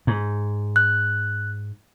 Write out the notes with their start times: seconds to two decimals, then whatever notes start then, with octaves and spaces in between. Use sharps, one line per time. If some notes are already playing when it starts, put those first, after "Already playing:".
0.07 G#2
0.76 F#6